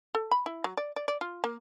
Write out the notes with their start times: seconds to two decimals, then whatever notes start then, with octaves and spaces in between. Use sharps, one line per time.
0.15 A4
0.31 B5
0.46 E4
0.64 F#3
0.77 D5
0.96 D5
1.08 D5
1.21 F4
1.44 A#3